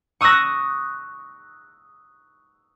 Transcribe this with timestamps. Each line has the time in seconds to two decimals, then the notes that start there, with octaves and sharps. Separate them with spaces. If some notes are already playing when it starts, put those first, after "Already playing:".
0.21 C#6 D#6 E6 F#6 A#6